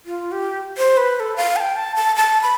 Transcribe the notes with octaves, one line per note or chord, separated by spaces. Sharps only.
F4
G4
C5
B4
B4
A4
F5
A5
G5
A5
A5
A5
B5